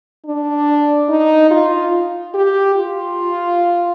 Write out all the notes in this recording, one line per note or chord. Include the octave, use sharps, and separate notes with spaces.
D4
D#4
F4
G4
F4